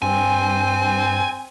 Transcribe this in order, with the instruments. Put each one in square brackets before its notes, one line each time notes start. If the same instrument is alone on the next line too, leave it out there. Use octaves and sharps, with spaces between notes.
[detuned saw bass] G2 [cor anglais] C4 [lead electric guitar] G#5